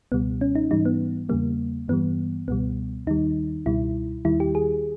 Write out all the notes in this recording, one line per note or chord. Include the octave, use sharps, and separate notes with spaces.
C#2 B2 G3 B3
C#4
D#4
G#2 E3 G3 D#4
B3
E2 C#3 G3 A#3
G2 E3 G3 B3
C#2 B2 G3 B3
D#2 D#3 G3 D#4
C#2 B2 G3 E4
D#2 D#3 G3 E4
G4
G#4